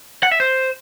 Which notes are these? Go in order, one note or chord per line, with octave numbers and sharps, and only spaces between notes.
F#5
E5
C5